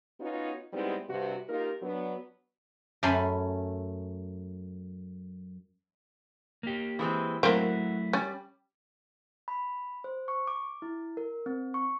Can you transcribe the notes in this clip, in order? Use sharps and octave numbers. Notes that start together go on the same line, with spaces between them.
B3 C#4 D#4 F4 F#4 C#5
G3 G#3 B3 C4 D#4 E4
G2 C3 F#4
A#3 D#4 F4 G4 A#4
F#3 B3 D4
F#2 A3 C#4 B5 C6
A#3 G4
E3 G#3 C4
F#3 A3 A#3 C4 E4 F#4 A#4
G3 C#4
B5
C5
C#6
D6
E4
A#4
C4
C#6